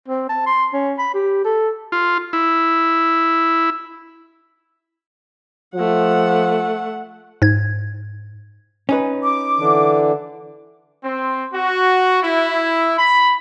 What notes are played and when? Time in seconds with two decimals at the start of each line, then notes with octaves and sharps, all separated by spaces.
0.08 C4
0.29 A5
0.46 C6
0.73 C#4
0.99 B5
1.14 G4
1.44 A4
1.92 F4
2.33 E4
5.75 F3 A3 F#5
7.42 G#2 G#6
8.89 C#4 D#4 B4
9.23 D6
9.58 D3 E3 D4
11.04 C4
11.54 F#4
12.23 E4
12.97 B5